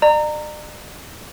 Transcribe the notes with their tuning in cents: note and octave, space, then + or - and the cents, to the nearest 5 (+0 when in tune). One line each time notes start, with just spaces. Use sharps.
D5 +45 A#5 -20